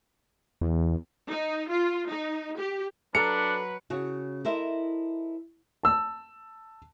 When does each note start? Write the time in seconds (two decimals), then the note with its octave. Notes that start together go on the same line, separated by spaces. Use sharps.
0.61 E2
1.28 D#4
1.70 F4
2.09 D#4
2.57 G4
3.15 F#3 D4 A4 B4 A#5 C#7
3.90 C#3 F#4 C#5
4.45 E4 A4 A#4 C5 D#5 E5
5.83 A5 E6